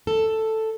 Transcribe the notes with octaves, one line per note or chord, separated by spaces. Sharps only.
A4